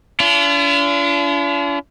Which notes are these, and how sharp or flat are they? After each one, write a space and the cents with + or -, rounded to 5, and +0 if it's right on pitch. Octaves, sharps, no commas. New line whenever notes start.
D4 -40 F4 -45